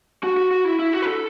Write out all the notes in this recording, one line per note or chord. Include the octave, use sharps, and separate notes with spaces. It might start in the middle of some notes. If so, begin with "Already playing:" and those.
F#4
F#4
F#4
E4
E4
F#4
B4
A4